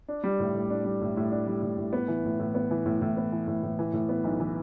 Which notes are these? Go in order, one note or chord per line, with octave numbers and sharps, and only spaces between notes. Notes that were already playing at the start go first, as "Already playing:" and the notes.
D4
G3
A2
A2
D4
G3
A2
A2
D4
G3
A2
A2
B3
E3
A2
A2
B3
E3
A2
A2
B3
E3
A2
A2
E3
A2
B3
B1
E3